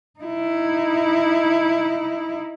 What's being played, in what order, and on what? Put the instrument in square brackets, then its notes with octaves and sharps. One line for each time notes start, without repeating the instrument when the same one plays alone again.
[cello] D#4 E4